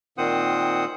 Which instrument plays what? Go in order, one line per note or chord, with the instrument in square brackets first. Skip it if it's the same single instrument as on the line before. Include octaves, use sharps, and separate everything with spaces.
[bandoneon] A#2 D#3 C4 C5 F#5 D#6